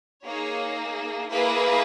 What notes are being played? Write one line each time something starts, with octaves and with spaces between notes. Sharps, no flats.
A#3 D#4 G#4 C#5
A#3 E4 G#4 B4